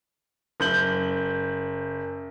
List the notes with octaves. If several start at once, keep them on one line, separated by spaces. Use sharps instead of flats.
F#1 G6 F#7